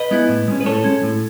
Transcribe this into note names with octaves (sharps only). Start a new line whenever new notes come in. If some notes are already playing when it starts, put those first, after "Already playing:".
Already playing: B4 D#5
G#3 B3 E4
A2
G#3 C#4
B4
A2 A4 C#5
G#3 C#4
A2